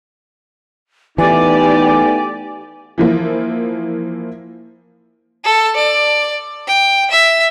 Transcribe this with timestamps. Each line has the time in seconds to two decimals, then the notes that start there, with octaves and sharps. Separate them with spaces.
1.18 E3 A3 B3 D#4 G4 D5 G#5
2.98 E3 F3 A#3 E4
5.44 A4
5.76 D5
6.68 G5
7.11 E5